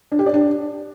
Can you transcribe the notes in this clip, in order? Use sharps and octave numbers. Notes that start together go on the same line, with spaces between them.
D4
G4
D5
D4